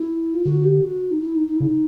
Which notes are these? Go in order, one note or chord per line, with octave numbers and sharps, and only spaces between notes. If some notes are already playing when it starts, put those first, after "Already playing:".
Already playing: E4
F4
D3 F#4
G4
F#4
D#4
E4
D#4
D#4
E4
C#3
D#4